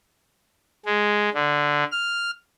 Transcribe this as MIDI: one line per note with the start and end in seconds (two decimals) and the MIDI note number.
0.85 1.29 56
1.34 1.84 50
1.92 2.31 89